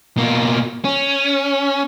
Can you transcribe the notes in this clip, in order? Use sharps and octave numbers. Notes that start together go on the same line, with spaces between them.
B2 A#3
C#4